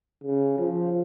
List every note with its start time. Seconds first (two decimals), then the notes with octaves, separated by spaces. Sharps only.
0.24 C#3
0.59 F3